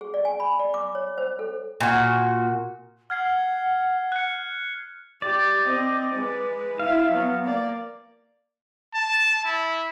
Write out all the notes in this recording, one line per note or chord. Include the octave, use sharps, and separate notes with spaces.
G#4
D5
G#5
B5
D5
D6
C#5
C5
A4
A#2 F#4
F#5 F6 G#6 C7
F#6 C#7
G4 D5
C4 D#5
G#3 B4
E4 E5 F5
F#3 B3
A#3 D5
A5
E4